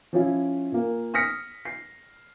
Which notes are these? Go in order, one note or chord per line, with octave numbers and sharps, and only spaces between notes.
F3 C#4 E4
A#2 A#3
D#6 F6 A#6 B6 C#7
C7